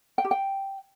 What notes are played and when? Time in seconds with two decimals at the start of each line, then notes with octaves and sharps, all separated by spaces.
0.18 G5
0.25 G4
0.31 G5